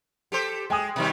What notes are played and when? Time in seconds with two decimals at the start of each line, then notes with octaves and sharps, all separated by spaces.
0.32 G4 A4 C5
0.70 G#3 G5 G#5 D#6
0.96 B2 D#3 G3